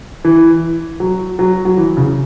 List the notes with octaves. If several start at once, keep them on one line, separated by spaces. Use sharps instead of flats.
E3
F#3
F#3
F#3
E3
C#3